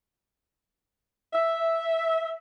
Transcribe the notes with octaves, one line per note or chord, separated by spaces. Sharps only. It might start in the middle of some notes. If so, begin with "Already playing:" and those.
E5